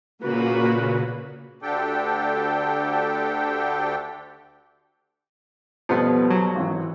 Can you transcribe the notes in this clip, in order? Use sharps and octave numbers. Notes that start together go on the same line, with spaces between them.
A#2 C#3 A#3 F#4 B4
D2 D3 D4 G4 A4 G5
F2 B2 F3 G3 B3
F#3
G#1 E3